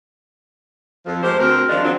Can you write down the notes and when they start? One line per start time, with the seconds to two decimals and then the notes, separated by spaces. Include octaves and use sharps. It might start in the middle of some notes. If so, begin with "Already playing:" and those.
1.06 F2 F3
1.23 G#3 A3 G4 A#4 C5
1.39 D2 C4 F#4 A#4
1.68 D#3 F3 G#3 D4
1.82 D#3 F#3 A#3 C4 D4 F4